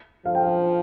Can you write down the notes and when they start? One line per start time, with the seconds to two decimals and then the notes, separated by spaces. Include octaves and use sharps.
0.25 F3 F5
0.35 G5
0.44 F5